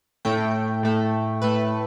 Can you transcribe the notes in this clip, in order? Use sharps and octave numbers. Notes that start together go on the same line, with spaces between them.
A2 A3 G5
A2 A3
A2 A3 B4